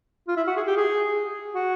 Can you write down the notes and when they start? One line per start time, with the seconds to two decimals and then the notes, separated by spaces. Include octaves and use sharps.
0.28 F4
0.37 E4
0.47 F#4
0.57 G#4
0.67 G4
0.77 G#4
1.55 F#4